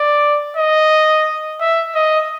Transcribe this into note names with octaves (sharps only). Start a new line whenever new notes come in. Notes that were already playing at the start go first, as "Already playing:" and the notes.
Already playing: D5
D#5
E5
D#5